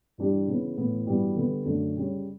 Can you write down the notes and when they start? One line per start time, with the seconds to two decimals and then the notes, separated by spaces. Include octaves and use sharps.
0.18 G2 E3 G3 D4 G4
0.47 C#3 E3 B3
0.76 A2 E3 B3 E4
1.06 G2 E3 G3 B3 F#4
1.36 D3 G3 B3
1.65 F#2 D3 A3 D4 F#4
1.95 C#3 G3 C#4